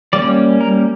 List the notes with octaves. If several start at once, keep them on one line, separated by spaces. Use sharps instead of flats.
G3 A#3 C#4 D5
A#4